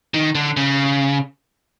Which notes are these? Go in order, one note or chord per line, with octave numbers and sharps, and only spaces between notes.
D#3
D3
C#3